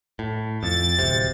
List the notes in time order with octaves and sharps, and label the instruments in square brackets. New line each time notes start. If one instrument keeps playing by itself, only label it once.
[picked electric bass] A2
[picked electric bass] F2 [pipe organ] A6
[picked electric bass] D1 C3